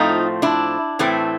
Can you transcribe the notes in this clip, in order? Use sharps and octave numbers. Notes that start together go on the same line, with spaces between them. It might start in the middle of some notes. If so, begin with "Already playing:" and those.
Already playing: A2 F3 A3 C4 D#4 F4
D4 E4
A2 E3 A3 C4